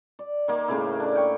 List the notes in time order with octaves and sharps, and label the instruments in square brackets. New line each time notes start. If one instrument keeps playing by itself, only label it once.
[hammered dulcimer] D5
D#3 A#3
A2 C#3 A#3 E4
D4 D5
G5 C#6